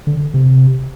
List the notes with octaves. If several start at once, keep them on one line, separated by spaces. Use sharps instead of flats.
D3
C3